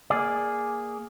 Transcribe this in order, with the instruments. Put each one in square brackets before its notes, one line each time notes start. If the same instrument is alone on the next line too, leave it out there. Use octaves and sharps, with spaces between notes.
[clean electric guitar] A#3 G#4 D5